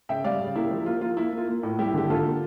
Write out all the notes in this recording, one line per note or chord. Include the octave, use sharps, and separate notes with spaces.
C#3 E5 G5
G3 D5 F5
C#3
A#3 E4 G4
F3
A#3 F4
A#3 F4
A#3 E4
A#3
F4
A#3
A2
G3 E4 G4
D3 G4
D3 F4 A4
A#3